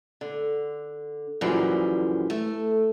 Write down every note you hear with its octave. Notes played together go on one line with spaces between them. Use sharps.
D3
F#2 A#2 D3 E3 F3 G3
A3